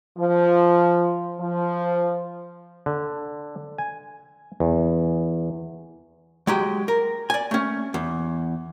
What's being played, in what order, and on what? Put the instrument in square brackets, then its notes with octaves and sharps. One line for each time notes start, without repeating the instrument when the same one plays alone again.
[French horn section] F3
F3
[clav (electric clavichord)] D3
G#5
E2
[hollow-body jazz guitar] F#3 G#3 G4
A#4
D5 G#5
A3 C#4
E2